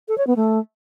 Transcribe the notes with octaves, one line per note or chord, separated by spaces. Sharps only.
A4
C#5
B3
A3